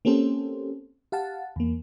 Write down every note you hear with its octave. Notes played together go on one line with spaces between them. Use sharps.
A#3 C4 C#4 G4 A4 C5
G4 F5 F#5 A5
E2 A#3